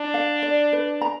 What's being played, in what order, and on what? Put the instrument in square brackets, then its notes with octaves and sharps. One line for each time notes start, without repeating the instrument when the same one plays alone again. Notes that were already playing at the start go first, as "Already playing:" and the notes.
Already playing: [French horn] D4
[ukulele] F5
D5
B4
A#5